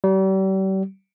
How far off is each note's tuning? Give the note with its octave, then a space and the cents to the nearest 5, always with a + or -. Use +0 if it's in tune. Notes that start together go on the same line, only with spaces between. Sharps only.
G3 -40